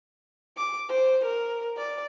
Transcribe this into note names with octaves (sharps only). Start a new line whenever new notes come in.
D6
C5
A#4
D5